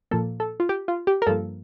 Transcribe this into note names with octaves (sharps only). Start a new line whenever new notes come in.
A#2 F3 A#3 A4
A4
F4
G4
F4
G4
A#4
G2 F3 A#3 A4